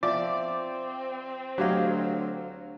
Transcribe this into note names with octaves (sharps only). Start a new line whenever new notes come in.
F3 C4 D5 E5 D6
D2 F#3 G4 C#5 D#5 F5